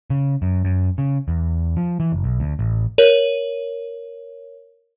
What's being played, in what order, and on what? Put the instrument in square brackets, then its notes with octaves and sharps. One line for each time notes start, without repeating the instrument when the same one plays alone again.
[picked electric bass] C#3
F#2
F#2
C#3
E2
F3
E3
F#1
B1
D2
A1
[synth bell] A#4 C#5